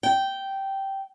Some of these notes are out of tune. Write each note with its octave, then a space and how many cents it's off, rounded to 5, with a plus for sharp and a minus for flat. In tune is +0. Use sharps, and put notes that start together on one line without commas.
G5 -10